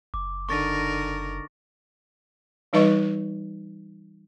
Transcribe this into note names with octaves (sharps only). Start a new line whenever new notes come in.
F#1 D6
D3 D#4 A#4 C#6 A6 A#6
E3 G3 D#4 B4 D#5 C#6